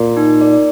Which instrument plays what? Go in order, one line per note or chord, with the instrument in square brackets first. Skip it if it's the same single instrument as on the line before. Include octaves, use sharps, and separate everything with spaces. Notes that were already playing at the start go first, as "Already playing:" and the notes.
Already playing: [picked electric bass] A#2
[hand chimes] D#4
A#4 D5